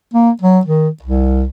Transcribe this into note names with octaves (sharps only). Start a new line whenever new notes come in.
A#3
F#3
D#3
C2